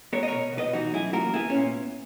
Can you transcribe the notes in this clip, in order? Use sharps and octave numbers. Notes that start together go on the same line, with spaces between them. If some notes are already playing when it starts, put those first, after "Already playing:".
B3 A#4 C#5
D#5
B2 A#4 C#5
B2
B4 D#5
E3 D#4 F#4
F#2 E4 G#4
A#3 F#4 A#4
B3 E4 G#4
A#2 C#4